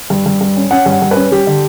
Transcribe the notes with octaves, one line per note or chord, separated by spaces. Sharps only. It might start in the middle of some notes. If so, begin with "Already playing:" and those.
G2
G2
G2
C#4
C#4 F#5
G2
F#5
G2
C#4 B4
G3 G4
D3